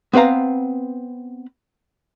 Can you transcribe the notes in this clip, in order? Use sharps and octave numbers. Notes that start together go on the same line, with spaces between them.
B3 C4 B4 F5 A#5